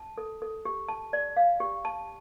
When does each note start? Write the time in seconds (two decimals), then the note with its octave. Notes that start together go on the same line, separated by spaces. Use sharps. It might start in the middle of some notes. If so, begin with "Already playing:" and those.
Already playing: A5
0.18 A4
0.42 A4
0.65 G4
0.88 A5
1.13 D5
1.37 F5
1.60 G4
1.85 A5